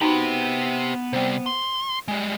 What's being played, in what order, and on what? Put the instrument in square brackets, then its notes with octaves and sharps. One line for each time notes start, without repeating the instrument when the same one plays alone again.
[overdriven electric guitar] B3 B5 [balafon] D#4 F#4 [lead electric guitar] G4 C5
[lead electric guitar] C3 G3 [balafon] C5 G5
[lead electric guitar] C6
[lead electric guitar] G3 G#3 [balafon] G#5